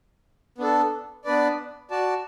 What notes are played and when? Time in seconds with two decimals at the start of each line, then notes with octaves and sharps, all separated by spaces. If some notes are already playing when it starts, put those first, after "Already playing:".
0.58 B3 D4 A4
1.25 B3 D4 B4 D5
1.90 F#4 D5 A5